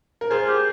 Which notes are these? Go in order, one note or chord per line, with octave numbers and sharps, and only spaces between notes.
A#4
F4 G#4 C5
G4